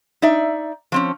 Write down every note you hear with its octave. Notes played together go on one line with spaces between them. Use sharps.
D#4 D5 E5
F3 C4 C#4